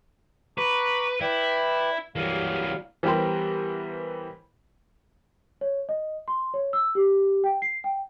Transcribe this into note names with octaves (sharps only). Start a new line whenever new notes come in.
B4 A#5 C#6 D6
E4 B4 D5 G5
E3 F#3 G3 A#3 F5
E3 G3 B3 G4 A#4 C5
C#5
D#5
C6
C#5
E6
G4
G5
C7
G5